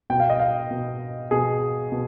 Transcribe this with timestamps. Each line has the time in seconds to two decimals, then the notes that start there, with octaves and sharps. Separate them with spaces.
0.10 B2 G5
0.20 F5
0.30 D#5
0.40 F5
0.71 B2
1.31 B2 G#4
1.92 B2